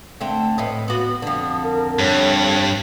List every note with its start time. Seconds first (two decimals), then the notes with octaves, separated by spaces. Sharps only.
0.21 D3 A3 C4
0.58 A2 B4 D#5
0.88 B3 F#4 D#6
1.22 F2 D3
1.63 A#4
1.99 G2 C#5